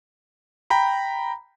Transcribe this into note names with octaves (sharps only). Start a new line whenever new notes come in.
G5 A#5 B5